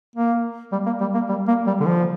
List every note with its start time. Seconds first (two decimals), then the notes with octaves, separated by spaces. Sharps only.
0.16 A#3
0.72 G3
0.86 A#3
1.01 G3
1.14 A#3
1.29 G3
1.48 A#3
1.67 G3
1.80 D3
1.86 F3